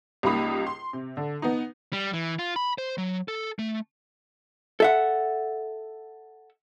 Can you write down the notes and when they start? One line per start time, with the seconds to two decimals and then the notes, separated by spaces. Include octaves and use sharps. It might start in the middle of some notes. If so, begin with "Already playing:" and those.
0.23 C#2 G3 A#3 D#4 B5 D#6
0.67 C6
0.93 C3
1.17 D3
1.42 B3 D#4
1.93 G3
2.13 E3
2.39 F4
2.56 B5
2.78 C5
2.98 F#3
3.28 A4
3.59 A3
4.80 A4 E5 F#5